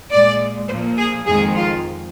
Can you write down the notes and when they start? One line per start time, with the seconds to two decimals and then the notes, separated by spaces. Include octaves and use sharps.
0.11 A#2 G#3 D5
0.69 A#2 F3 A#3 C5
0.98 G#4
1.26 F2 D#3 G#3 G#4
1.55 F4